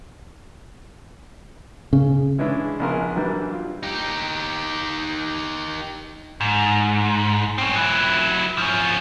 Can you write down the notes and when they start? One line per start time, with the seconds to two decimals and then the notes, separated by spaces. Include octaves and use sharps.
1.93 C#3
2.38 E3 G#3 C#4 D4 E4
2.79 A#1 C#3 B3 A#4 G#5 C6
3.15 E3 F#3 G3 A#3 D4
3.53 F4
3.83 D#4 G4
6.41 G#2
7.58 C4 C#4
7.76 F#3 E4
8.58 F3 C#4